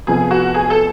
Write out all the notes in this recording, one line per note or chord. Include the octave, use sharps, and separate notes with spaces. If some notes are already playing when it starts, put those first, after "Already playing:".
F1 F2 F3 B3 G#4
F#4
G#4
A4